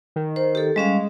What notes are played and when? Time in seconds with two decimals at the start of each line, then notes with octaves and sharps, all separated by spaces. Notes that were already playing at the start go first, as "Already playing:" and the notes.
0.16 D#3
0.36 C5
0.55 G4 A4
0.76 G3 G#3 C#4 F5